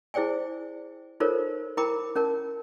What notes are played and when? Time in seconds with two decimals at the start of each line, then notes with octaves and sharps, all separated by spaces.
0.14 E4 G#4 C5 D5 G5 G#5
1.20 D#4 F4 A4 A#4 C5 C#5
1.77 E4 A#4 G5 A#5 B5 D6
2.16 C#4 A#4 A5